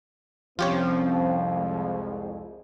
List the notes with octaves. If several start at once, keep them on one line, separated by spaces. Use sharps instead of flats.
C2 F2 F3 C4 C#4 F4 G4 C#5
G#3